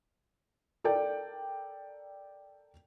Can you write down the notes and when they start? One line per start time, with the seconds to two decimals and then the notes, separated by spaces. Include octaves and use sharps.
0.84 A4 A#4 D5 G5